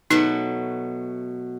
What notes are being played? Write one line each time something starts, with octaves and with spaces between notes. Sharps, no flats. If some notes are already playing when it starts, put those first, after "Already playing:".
B2 F#3 A3 D#4